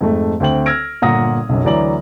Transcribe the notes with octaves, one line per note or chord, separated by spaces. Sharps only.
F2 G#2 A3
D2 C4 G5 F#7
E6 F6 G#6 A#6 D7
G1 A#2 F#5 A#5 D#6 A#6
B1 F#2
D2 E3 F#3 D5 A#5 F#7